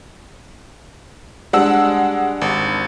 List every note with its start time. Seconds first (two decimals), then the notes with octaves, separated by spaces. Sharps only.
1.53 G3 G#3 D4 F#5 E6
2.41 G#1